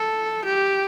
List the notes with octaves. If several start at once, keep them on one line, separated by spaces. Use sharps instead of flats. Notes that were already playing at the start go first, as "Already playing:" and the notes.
Already playing: A4
G4